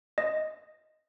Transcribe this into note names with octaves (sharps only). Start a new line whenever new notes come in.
D#5